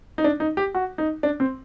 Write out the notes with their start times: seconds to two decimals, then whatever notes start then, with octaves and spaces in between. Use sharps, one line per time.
0.18 D#4
0.24 D4
0.40 D#4
0.57 G4
0.75 F#4
0.98 D#4
1.23 D4
1.40 C4